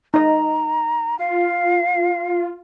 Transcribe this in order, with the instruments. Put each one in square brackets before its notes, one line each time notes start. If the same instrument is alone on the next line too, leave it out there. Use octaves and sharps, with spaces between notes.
[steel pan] D#4 D#5 [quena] A#5
[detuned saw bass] F4 [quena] F5